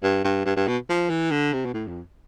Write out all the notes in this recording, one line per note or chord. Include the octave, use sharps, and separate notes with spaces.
G2
G2
G2
G2
B2
F3
E3
D3
C3
B2
A2
F2